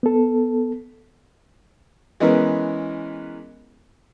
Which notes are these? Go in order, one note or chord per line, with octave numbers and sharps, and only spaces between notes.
B3 A4
E3 G#3 B3 C#4 A#4